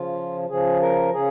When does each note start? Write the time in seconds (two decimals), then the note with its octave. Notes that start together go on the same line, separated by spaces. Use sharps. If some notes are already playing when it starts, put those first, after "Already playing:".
Already playing: C#3 F3 F4
0.49 C#3 F3 G#4
0.81 A#4
1.13 C#3 G#4